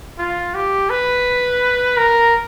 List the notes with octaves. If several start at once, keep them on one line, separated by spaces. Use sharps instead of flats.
F4
G4
B4
A#4